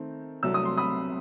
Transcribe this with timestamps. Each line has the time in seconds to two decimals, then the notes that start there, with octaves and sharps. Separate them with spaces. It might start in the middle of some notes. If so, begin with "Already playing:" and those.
Already playing: D#3 A3 C4
0.43 C2 C3 F#3 A3 E6
0.54 D#6
0.65 C6
0.78 B5 D#6